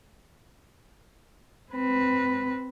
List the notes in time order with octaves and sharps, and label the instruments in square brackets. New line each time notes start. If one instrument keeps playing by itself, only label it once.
[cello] C4 B4